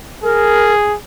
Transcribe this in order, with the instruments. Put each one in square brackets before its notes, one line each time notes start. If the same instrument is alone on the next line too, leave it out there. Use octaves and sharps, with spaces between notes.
[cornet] G#4 [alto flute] A#4